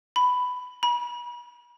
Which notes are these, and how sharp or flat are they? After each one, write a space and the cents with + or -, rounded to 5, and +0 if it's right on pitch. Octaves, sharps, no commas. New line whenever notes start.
B5 +10
B5 -35